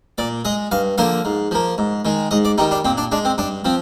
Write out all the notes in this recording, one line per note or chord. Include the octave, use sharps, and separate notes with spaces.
A#2 D5
G#3 D#5
G2 F5
D3 F3 A#3 F5
G#2
F3 A#3
G#2
D#3 G#3
G#2 D#5
D5
D#3 G3 D#4
D4
A#2 C4
D4
G#3 D4
C4
G2 D4
F3 C4